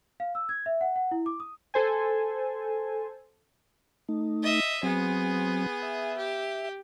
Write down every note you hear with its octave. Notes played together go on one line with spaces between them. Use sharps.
F5
E6
G#6
E5
F#5
F#5
E4
D6
D#6
A4 C5 G#5
A3 D#4
D#5 E5
F#3 B3 C4 G#4
E5
G4